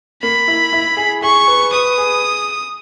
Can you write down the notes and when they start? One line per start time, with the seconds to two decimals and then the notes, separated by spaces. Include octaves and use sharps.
0.23 A#3 B5
0.48 E4
0.73 E4
0.97 G#4
1.23 G#4 C#6
1.47 B4
1.72 B4 D#6
1.98 G#4